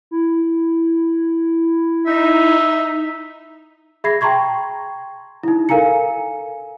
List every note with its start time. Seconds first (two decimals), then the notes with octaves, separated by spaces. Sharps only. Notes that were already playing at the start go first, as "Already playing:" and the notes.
0.11 E4
2.07 D#4 E5
4.04 G#4 E5 B5 G#6 A#6 C7
4.21 G5 A5 A#5 C6 C#6 G#6
5.43 D#4 E4
5.69 A4 A#4 F5 G#5 A#5 C#7